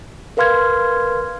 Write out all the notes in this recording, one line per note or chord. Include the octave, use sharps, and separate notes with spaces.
A#4 B4 F5 C6 F6 G#6